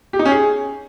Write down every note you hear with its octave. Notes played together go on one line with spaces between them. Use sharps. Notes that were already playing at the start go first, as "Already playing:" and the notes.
G4
D#4
C#4
G#4